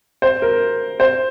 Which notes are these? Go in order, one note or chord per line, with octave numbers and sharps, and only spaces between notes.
C5
A#4
C5